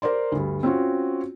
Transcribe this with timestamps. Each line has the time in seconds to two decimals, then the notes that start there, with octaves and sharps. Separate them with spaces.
0.02 A#4 C5 D5 C6
0.32 D2 G2
0.63 C4 C#4 F4 F#4